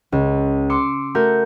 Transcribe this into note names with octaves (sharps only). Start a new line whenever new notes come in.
C#2
C6 D6 E6 C#7
A3 F#4 A#4 G6